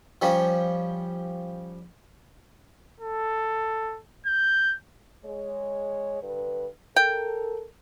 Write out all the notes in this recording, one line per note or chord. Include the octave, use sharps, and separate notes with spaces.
F3 G3 C#4
A4
G6
G#3 C#5
G2 D3 B4
A4 A#4 G5